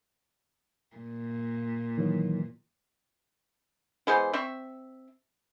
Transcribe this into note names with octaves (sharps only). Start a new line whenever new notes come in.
A#2
D#3 E3 F#3
E3 G#3 B3 C5
C4 E5 C#6